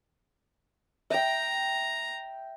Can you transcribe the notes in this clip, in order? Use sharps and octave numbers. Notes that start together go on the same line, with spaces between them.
E5 G5 A#5